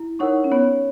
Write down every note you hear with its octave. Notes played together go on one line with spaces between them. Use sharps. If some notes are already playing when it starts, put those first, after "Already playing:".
Already playing: E4
D#4 A#4 C#5 F#5 C#6
C#4
B3 C#5